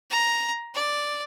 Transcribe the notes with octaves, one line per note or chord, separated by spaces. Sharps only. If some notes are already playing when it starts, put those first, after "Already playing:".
A#5
D5